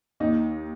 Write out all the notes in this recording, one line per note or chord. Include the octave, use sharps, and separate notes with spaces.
D#2 D#4